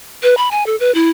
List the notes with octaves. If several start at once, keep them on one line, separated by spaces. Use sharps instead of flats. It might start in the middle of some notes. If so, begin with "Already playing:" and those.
B4
B5
G#5
A4
B4
E4